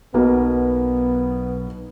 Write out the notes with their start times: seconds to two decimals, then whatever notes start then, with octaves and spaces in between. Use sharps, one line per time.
0.14 B1 B2 A#3 B3